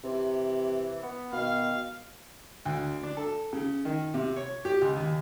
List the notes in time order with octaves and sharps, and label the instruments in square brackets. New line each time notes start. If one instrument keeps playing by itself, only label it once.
[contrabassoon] C3 [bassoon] E3
[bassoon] B3
[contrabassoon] B2 [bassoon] D#3 [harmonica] F5
[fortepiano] D2
D4
A4
C#3
D#3
C3
C#5
G4
C#2
D#2